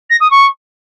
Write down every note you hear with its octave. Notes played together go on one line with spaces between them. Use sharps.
A#6
D#6
C#6